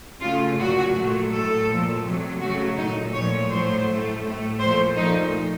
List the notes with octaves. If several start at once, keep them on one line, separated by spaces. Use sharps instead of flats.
C#3 A3 F4
A#2 F#3 A3 F#4
A#2 F#3 A3
A2 A3 A4
A#2 F3 A3
C3 F#3 A3
C#3 F#3 A3 F#4
A#2 A3 D#4
A#2 F3 A3 C#5
A2 F#3 A3 C5
A2 A3
A2 A3
A#2 F3 A3 C5
A#2 F3 A3 D#4